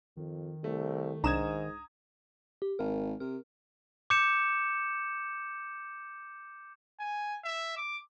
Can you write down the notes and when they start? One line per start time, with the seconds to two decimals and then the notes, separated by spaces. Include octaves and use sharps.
0.17 F2 D#3
0.64 C2 A3
1.24 C2 G#2 D4 A#5 D#6 G#6 E7
2.62 G4
2.79 G#1 A#4
3.20 C3 A#4
4.10 D6 G6 C#7 E7
7.00 G#5
7.44 E5
7.77 D6